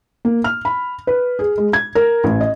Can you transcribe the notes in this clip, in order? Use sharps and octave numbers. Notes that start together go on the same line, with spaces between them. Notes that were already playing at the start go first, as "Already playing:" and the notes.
A#3
F6
B5
B4
G#4
G#3
G#6
A#4
A1
D#5